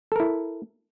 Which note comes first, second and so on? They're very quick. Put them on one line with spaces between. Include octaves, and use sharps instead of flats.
A4 A#4 E4